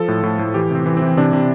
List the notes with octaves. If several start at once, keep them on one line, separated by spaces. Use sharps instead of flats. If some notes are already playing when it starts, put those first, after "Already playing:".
Already playing: F3 A4
A2
A2
A2
E3 G4
C3 C4
E3
E3 C4
C3 D4
C3